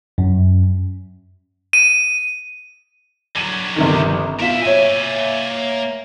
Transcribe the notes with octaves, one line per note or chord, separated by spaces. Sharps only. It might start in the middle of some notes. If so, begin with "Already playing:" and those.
F#2
D#7
D3 F#3 G#6 D#7
G1 C3 D#3
B2 F4 A#4 E5 B6
A#3 C#5 E5 G#5